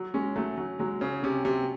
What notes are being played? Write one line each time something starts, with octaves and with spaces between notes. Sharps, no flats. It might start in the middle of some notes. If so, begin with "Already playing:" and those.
Already playing: F#3
G#3 C#4
F#3 A3
F#3
F#3 G#3
C#3 C#4
C3 C#4
C3 F#3